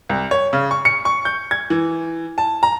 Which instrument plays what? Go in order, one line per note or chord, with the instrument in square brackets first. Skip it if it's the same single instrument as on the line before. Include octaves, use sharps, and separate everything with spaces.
[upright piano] C2
C#5
C#3
C#6
C#7
C#6
G6
G#6
E3
A5
A#5